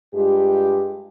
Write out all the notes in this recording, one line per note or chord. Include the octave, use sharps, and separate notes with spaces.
G2 G#3 F4 G4